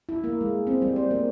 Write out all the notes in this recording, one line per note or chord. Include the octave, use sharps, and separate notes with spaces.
E4
A#3
G#3
C4
G3
C5
A#3